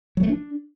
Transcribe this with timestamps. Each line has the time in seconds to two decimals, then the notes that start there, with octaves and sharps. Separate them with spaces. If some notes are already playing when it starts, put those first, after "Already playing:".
0.17 F#3
0.23 A3
0.29 D4